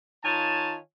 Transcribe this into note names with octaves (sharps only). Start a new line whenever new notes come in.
D#3 F4 C#5 G#5 A5